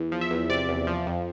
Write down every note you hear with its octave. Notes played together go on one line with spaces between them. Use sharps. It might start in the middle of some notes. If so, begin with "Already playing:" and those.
Already playing: E2
F3
E5
E2
C3 D5
E2
F3
F2